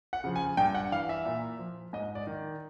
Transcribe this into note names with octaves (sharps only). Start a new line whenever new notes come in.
F#5
C#3 F3
G#5
G2 G5
F#5
E3 F5
E5
A#2
F3
G#2 D#5
D5
D#3